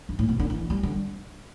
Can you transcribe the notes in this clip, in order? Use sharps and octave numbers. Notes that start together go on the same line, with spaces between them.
G2
A2
B2
D3
E3
G3
D3